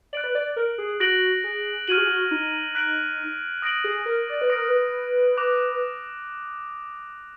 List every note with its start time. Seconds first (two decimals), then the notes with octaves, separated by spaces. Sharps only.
0.13 D5 F#6 D7 F#7
0.24 B4
0.35 D5
0.56 A#4
0.78 G#4
1.00 F#4 F#6 A#6 D7 F#7
1.44 G#4
1.88 F#4 F6 G#6 D#7 F#7
1.98 G#4
2.07 F#4
2.31 D#4
2.75 F#6 B6 D7 F#7
3.62 D#6 A#6 D7 F#7
3.84 G#4
4.06 A#4
4.29 D5
4.41 B4
4.50 D#6 A#6 D7
4.55 A#4
4.68 B4
5.37 D6 F#6 A#6 F7